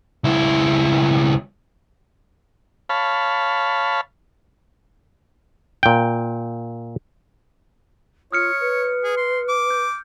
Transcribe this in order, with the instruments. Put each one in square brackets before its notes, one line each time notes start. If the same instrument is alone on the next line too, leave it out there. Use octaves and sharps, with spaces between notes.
[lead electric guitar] C#2 E4
[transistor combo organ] C#5 F5 A5 B5
[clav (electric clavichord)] A#2 G5
[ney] F4 [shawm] C#5 [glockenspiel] D#6 F6 C#7
[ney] B4
[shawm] G#4
C6
D6
[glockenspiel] G6